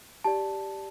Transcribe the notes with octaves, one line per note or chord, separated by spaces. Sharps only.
G4 D5 A5